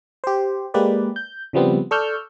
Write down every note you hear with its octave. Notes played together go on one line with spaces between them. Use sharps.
G4 C5
G#3 A#3 G4 B4 D5
G6
C#3 F3 G3 B3 C4
A4 D5 C#6 E6 F6 G6